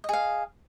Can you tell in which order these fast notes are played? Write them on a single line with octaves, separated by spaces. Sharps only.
D#5 G#4 F5